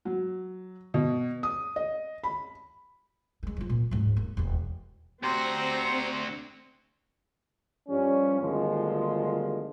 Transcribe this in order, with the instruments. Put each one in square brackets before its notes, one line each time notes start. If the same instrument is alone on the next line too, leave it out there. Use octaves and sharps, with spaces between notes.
[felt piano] F#3
B2
D#6
D#5
B5
[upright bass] G#3 A#3
F3 F4
A#2
D1 G#2
A#3
E1 D#2
[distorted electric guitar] D2 F#4 [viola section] C4 [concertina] G4 C5 A#5 [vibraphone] C6
[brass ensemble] G2 F3 G3 C#4
G1 D2 D#3 F3 G#3